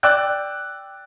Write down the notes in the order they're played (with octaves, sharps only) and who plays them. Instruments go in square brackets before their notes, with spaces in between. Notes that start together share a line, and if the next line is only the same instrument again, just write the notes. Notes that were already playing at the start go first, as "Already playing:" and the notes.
[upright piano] D5 G5 E6 F#6